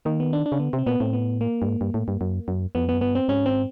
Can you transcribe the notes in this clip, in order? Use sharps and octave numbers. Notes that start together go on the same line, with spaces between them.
D#3 A#3
B3
D4
D4
C#3
D3 B3
C3
C4
A#2 B3
A2 C4
B3
A#3
G2
G#2
G2
A2
G2
F#2
F#2
F2 B3
B3
F#2
G2 B3
C4
G#2 C#4
C4